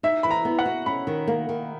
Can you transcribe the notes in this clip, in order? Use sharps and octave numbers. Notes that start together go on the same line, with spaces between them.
D#4 E5
E3 B5
A#5
B3
F#5
F#4
C#4 B5
D#3
A#3
D#3